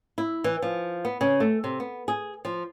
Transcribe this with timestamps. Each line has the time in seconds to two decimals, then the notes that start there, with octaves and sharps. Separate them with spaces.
0.18 E4
0.44 E3
0.62 F3
1.05 B3
1.21 C#3
1.40 A3
1.64 C3
1.80 B3
2.08 G#4
2.45 F3